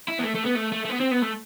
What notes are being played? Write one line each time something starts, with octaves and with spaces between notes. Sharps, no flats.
E4
B3
A3
A3
B3
A3
A3
A3
B3
C4
B3
A3